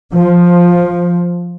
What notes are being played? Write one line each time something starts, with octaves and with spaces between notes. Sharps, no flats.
F3